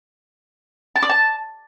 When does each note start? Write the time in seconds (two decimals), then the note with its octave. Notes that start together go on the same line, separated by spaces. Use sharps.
0.96 A5
1.02 D5
1.09 A5